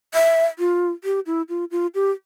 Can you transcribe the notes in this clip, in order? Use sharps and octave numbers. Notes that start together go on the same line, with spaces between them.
E5
F4
G4
E4
F4
F4
G4